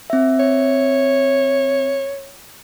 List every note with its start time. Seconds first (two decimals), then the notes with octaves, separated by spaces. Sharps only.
0.10 C4 E5
0.40 C#5